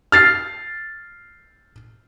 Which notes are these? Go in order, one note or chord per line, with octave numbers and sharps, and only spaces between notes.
F6 A6 C7